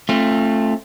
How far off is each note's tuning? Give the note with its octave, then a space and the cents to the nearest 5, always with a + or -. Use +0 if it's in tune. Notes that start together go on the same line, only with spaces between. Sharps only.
A3 +0 C4 +40 F4 -10